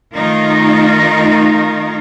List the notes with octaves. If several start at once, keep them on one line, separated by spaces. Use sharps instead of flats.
D#3 A3 D#4 F4 A#4